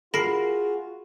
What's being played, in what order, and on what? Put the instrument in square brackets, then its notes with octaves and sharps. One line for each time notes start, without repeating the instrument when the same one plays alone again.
[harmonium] F4 F#4 [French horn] G#4 [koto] A#4 [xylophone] B5 C7